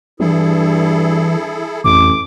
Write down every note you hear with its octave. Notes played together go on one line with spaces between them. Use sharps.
G2 E3 E4 G#4 A4
A1 F2 D6